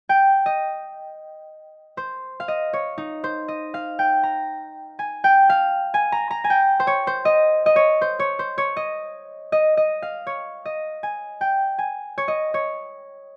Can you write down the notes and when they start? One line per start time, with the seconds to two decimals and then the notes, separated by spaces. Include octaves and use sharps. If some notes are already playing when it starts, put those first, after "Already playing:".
0.09 G5
0.46 D#5
1.97 C5
2.40 F5
2.48 D#5
2.73 C#5
2.98 D#4
3.24 C5
3.48 D#5
3.74 F5
3.99 G5
4.23 A#5
4.99 G#5
5.24 G5
5.50 F5
5.94 G#5
6.12 A#5
6.31 A#5
6.44 G#5
6.50 G5
6.80 C5
6.87 C#5
7.07 C5
7.25 D#5
7.66 D#5
7.76 C#5
8.01 C5
8.19 C#5
8.39 C5
8.58 C#5
8.77 D#5
9.52 D#5
9.77 D#5
10.02 F5
10.27 C#5
10.66 D#5
11.03 G#5
11.41 G5
11.79 G#5
12.18 C#5
12.28 D#5
12.54 C#5